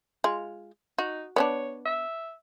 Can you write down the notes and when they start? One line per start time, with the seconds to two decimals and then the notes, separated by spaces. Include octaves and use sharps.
0.24 G#3 F4
0.98 D#4 F#4
1.36 B3 C#4 D4 C#5
1.86 E5